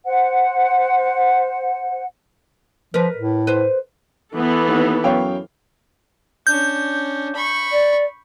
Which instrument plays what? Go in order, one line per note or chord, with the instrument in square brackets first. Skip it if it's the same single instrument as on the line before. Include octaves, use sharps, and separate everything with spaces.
[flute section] C5 F#5
[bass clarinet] F3 [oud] A#4 B4
[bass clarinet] A2
[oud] B4 C5
[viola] E3 A4 [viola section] B3
[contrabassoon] D#2
[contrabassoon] F#2 [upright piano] C#5 F5 G5
[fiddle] C#4 D4 [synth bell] G6
[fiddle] B5 C#6
[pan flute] D5